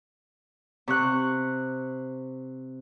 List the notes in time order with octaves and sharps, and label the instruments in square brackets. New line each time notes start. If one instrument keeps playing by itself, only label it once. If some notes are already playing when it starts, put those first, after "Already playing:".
[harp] C3 C#6 F#6